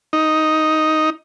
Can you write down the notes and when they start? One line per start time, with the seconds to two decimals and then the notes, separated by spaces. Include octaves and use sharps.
0.13 D#4